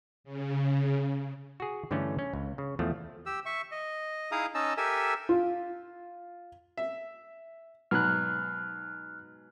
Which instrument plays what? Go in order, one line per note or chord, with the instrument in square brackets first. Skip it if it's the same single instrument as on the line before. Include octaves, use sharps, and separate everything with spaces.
[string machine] C#3
[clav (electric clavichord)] F#4 G#4
G2 D3 E3 A3 C#4
C#4
C#2
C#3
E2 F3 A3
[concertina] G4 E6
E5 C#6
D#5
D#4 E4 G#4 F5 A#5 D#6
C#4 D#4 D#5 A5 E6
G4 A4 A#4 E5 G#5 E6
[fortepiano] F4
E5
[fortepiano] G#2 B2 F#3 [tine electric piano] F6 F#6